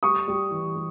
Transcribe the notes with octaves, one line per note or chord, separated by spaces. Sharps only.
G3 C#6 D#6
G3
E3
G3